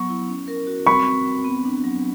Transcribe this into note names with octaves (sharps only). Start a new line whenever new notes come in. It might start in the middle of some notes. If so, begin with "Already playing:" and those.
Already playing: F#3 B3 C#6
E4
C#4
A#4
F#4
C4 B5 C#6
C4
C4
B3
D4
F#3